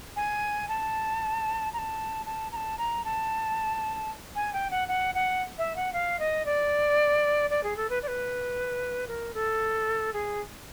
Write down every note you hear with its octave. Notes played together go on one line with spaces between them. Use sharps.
G#5
A5
A#5
A5
A5
A#5
A5
A#5
A5
G#5
G5
F#5
F#5
F#5
E5
F#5
F5
D#5
D5
D5
G#4
A4
B4
D5
B4
A#4
A4
G#4